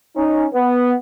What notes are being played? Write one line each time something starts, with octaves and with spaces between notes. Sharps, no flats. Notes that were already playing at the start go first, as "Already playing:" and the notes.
C#4 D#4
B3